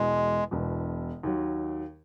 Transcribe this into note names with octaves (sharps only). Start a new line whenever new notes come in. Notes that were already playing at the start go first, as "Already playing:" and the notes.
Already playing: E1 E2 B2 G#3
E1 E2 B2
D#2 D#3 F#3